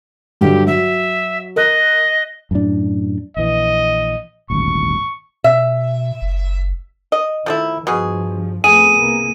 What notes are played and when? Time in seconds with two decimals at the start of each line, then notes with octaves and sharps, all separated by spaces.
0.41 G2 D3 F#3 G4
0.67 F#3 E5
1.56 A#4 D#5 F#6
2.51 F#2 A2 D4
3.37 A#1 E3 D#5
4.50 D#1 G#1 D2 C#6
5.44 B2 E5
6.22 F#1
7.12 D#5
7.46 D#3 F3 A3 E4
7.87 G2 B2 F3 G#4
8.64 F2 A3 B3 G#4 D#7
9.00 C2 A#3